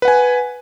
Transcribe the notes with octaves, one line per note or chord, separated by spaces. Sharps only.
B4 F#5 G#5